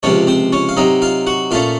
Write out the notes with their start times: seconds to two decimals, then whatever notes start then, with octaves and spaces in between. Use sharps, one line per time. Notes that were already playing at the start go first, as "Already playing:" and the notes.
0.03 C#2 C3 F3 C4 C#4 C#5
0.27 C4 C5
0.52 C#4 C#5
0.69 F5
0.77 C3 F#3 C4 D#4 D#5
1.02 F4 F5
1.27 F#4 F#5
1.51 A#2 A3 C#4 F4 F5